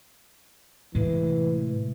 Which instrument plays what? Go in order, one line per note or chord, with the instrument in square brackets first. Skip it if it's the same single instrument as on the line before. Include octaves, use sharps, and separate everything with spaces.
[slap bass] A2 C3 G#3 [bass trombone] E3